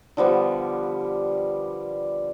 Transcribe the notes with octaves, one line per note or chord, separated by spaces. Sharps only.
D3 F3 G3 B3